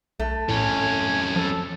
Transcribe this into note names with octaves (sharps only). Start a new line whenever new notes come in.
B1 A3
F2 A2 C#4 G#5
F3 A4